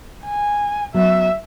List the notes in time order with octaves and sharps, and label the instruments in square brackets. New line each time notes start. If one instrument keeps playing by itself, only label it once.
[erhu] G#5
[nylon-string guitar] F#3 B3 C#4 [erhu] E5